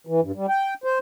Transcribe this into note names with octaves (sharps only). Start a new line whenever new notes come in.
E3
G2
G3
G5
C5